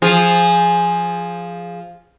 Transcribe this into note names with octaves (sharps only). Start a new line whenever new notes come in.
F3 F4 G#4